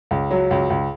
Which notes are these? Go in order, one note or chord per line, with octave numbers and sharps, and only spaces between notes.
C#2
F#3
C#2
C#2